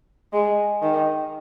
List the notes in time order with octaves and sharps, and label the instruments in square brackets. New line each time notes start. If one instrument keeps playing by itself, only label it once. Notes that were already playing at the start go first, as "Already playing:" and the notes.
[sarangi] G#3
D#3